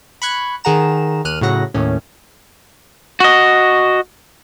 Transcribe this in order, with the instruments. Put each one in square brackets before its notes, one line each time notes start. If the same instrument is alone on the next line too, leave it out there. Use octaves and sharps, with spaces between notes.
[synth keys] B5 C#6 F#6 G#6
D#3 G#4 F#5 A#5 E7
D#2 F6 F#6 D#7
A2 C#3 F#3 F#5 A#6
D#2 A2 C#4
[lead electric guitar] F#4 D#5